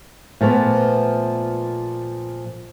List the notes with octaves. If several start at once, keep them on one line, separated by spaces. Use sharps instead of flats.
A#2 F3 A3 B3